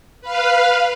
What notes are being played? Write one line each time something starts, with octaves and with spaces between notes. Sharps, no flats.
B4 F5